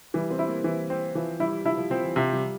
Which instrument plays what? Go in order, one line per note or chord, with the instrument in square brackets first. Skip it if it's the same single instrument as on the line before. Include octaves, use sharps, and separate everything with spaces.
[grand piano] E3 [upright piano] G3
[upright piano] C4
[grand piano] E4
[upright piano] A#3
[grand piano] E3
C4
[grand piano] E3 [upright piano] F3
[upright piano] G3 [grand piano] E4
[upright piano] F3 [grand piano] E4
[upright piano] F3
[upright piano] F3 [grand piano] C4
[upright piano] E3
[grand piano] C3 [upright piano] F3
[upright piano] G3